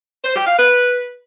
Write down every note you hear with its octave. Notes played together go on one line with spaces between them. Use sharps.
C5
G4
F5
B4